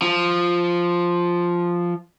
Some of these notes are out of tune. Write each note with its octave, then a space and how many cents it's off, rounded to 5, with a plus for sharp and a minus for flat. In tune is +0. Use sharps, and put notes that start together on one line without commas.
F3 +0